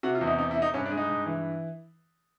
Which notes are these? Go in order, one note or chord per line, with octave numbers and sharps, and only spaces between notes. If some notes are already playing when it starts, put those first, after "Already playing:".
C3 F#4
F4
E2 E4
D#4
C3 D#4
E4
C3
D#4
G2 C#4
D4
G#3
D#4
G2
E3